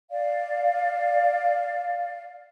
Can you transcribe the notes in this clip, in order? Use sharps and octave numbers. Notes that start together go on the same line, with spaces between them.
D5 F5